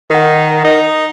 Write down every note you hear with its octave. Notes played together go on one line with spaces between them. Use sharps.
D#3 A#4 F#5
D#4